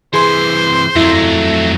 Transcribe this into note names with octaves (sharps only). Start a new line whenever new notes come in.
C3 E3 G#4 C5 C6
F2 F#3 A3 E4